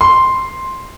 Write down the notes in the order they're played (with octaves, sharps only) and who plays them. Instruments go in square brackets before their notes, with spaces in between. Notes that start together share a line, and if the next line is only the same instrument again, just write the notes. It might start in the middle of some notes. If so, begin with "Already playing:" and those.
[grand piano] C6